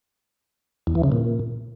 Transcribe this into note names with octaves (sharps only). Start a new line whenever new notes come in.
E2
E3
C#3
A#2